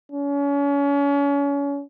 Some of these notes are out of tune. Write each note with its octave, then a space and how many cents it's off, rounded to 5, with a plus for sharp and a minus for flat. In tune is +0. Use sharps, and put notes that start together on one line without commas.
C#4 +35